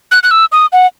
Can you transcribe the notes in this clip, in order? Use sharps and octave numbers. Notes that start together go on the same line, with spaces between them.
F#6
F#6
E6
D#6
F#5